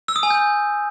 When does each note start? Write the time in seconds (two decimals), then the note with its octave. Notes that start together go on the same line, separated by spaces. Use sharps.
0.08 E6
0.16 D#6
0.23 G#5
0.30 G6